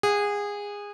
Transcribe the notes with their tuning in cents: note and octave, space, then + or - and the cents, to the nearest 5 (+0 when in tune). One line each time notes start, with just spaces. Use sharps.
G#4 -20 F#5 +0